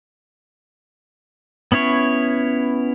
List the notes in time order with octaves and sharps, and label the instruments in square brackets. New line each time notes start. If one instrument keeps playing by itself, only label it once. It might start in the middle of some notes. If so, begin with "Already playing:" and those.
[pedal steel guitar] B3 C#4 E4 C#5